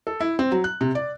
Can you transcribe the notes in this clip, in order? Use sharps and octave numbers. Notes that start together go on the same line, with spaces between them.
A4
E4
C4
F#3
F#6
C3
D5